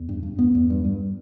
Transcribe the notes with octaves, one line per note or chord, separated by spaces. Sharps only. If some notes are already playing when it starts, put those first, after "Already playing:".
Already playing: E2
G2
G2
E2 B3
E2
G2
G2